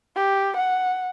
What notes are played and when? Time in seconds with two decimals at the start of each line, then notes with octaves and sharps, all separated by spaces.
0.16 G4
0.57 F#5